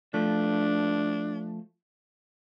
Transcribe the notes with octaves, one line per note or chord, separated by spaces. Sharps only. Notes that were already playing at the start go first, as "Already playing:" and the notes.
F3 A3 D4